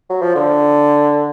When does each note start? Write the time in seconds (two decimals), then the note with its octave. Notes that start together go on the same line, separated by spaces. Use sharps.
0.10 F#3
0.22 F3
0.35 D3